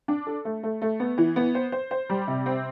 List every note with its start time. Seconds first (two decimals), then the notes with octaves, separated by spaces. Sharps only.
0.08 D4
0.27 A4
0.45 A3
0.63 A3
0.82 A3
1.00 B3
1.18 E3
1.36 B3
1.55 C5
1.72 C5
1.91 C5
2.10 G3
2.28 C3
2.46 C4